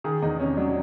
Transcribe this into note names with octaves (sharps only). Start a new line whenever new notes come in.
D#3 G#4
E2 D#4
C3 C#4
F#3 D4